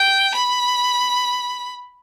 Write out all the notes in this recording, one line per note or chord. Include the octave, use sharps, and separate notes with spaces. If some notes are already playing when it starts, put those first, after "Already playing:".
Already playing: G5
B5